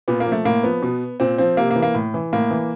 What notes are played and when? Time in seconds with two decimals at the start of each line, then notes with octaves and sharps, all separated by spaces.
0.08 A#2 B3
0.20 A#3
0.26 F3
0.32 A3
0.45 A2 A#3
0.63 F3 B3
0.82 B2
1.20 A#2 C4
1.38 F3 C4
1.57 C3 A#3
1.71 A#3
1.76 E3
1.82 A#3
1.95 A2
2.14 E3
2.33 A2 A#3
2.51 E3